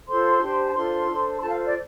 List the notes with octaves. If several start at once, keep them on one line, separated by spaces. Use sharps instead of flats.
F4 A4 C5 C6
D4 G4 C5
A5
D4 F4 A4 C5 C6
D4 A4 C5
C6
F4 A4 C5 A5
F5
D5